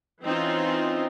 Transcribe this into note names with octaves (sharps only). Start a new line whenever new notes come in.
E3 C4 C#4 D#4 F4